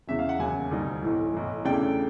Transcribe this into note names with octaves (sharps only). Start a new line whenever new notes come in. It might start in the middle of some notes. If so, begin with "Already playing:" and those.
E1 E2 C#3 E3 E5
F5
F#5
D#2 C#3 F#3 G#5
D2 D3 G3 C4 D#4
B1 A2 E3
B1 A2 E3
E2 C#3 E3 A3 D4 G5